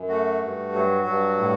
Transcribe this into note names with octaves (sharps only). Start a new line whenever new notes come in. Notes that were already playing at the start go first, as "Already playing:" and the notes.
Already playing: F#2
A3 F#4
G2
F#3
G2
A2